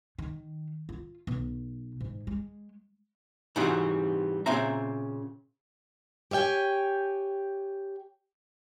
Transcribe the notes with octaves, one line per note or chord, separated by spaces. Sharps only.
D#3
F4
B1
G#2
G#3
G#2 C3 E3 G3 C4 F#4
A#2 C#3 C4 C5 E5 A#5
G4 C#5 E5 G5 G#5